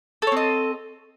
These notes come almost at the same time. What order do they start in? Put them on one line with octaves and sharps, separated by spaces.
A4 C#5 C4 D#5